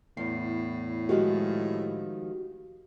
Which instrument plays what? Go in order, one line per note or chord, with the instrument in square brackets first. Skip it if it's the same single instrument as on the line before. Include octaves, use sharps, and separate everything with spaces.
[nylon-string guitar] E2 [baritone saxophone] A2 [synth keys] C7
[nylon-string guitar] D#3 F3 G#3 [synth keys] F#4 G4